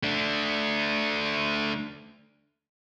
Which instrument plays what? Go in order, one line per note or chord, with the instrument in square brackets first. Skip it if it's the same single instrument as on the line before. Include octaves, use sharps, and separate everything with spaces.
[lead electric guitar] A3 D4